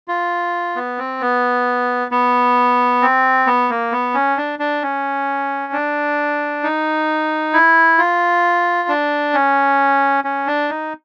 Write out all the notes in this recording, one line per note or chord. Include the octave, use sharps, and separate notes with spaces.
F4
B3
C4
B3
B3
C4
B3
A#3
B3
C#4
D4
D4
C#4
D4
D#4
E4
F4
D4
C#4
C#4
D4
D#4